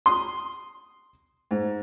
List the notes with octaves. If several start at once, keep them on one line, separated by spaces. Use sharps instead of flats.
C6 D#6
G#2